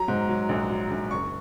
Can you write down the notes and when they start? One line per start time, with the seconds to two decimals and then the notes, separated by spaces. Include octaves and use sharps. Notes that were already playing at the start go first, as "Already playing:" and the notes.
Already playing: F#3 A#5
0.08 G#2
0.29 F#3
0.49 A#1
0.70 F#3
0.91 A#1
1.11 F#1 C#6